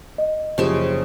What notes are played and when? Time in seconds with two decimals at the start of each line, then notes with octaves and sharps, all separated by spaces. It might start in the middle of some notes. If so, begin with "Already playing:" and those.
0.18 D#5
0.58 F#1 C#3 F3 G4 C5 E5